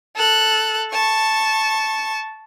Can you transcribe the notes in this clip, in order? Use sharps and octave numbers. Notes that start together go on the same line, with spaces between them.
A4 F#6
A5 C#6